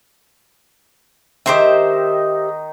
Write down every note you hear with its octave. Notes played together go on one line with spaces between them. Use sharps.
D#3 D#4 G4 C5 E5